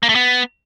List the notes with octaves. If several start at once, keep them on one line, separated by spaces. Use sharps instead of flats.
A#3
A3
B3